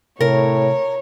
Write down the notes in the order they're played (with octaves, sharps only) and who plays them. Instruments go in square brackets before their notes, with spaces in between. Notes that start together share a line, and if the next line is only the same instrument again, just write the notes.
[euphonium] A2 [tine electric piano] C3 [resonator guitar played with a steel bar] A#4 [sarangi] C#5